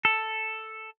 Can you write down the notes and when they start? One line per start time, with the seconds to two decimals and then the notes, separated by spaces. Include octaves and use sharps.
0.05 A4